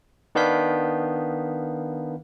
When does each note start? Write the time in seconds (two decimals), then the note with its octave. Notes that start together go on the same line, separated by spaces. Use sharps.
0.35 D#3 B3 D4 F5 G6 B6